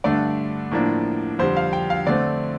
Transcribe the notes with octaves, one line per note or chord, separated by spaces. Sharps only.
G2 D3 A3 D4 D5
A2 F3 A#3 D4
F2 D3 G3 C5
F5
G5
F5
D3 A3 C4 D5